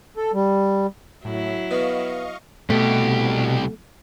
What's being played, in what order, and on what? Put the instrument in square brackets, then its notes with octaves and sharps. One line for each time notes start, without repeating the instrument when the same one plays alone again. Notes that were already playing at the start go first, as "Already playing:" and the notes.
[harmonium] A4
G3
[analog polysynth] A2 [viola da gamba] F#3 E4
[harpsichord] B3 [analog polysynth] D#5 F5 C#6
[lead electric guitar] C2 G4 [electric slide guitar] B2 [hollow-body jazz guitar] A3